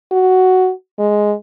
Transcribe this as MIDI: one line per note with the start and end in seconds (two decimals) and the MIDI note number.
0.12 0.71 66
0.99 1.34 56